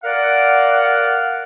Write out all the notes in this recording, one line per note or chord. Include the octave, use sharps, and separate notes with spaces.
A#4 D5 F5 F#5